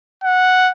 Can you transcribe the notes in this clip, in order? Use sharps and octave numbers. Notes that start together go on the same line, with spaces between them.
F#5